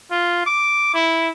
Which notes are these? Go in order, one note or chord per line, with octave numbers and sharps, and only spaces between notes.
F4
D6
E4